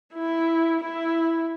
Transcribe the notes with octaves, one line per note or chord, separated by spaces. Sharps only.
E4
E4